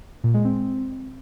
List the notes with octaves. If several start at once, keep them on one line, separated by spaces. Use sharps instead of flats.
A#2
G#3
C4